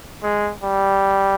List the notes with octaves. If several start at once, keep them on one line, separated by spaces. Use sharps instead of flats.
G#3
G3